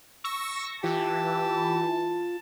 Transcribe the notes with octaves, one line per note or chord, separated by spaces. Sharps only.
C#6 E6 A#6
E3 F4 G4 A5